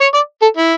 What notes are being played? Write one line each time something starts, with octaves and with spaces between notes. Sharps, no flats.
C#5
D5
A4
E4